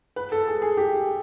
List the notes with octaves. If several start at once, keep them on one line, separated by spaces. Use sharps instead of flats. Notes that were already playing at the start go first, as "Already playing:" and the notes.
B4
A4
G#4
G#4
G4